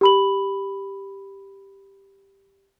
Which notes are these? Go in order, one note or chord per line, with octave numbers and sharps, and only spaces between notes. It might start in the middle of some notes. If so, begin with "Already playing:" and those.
G4 B5 F#7